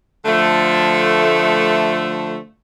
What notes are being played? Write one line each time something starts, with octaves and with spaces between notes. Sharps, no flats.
D3 F3 A3